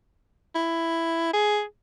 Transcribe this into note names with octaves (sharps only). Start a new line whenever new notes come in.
E4
G#4